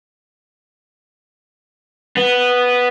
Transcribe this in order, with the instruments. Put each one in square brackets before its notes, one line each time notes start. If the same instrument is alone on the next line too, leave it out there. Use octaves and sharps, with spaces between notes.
[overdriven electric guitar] B3